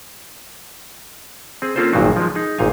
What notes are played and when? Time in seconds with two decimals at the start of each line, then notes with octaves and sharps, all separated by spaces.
1.62 C4 G#4
1.76 A#3 C4 C#4 F4 A4 C5
1.93 G#1 G2 A#2 D#3 F#3 F#4
2.16 F3 G#3
2.35 D#4 G#4
2.58 G#1 A#2 D#4 F5 G#5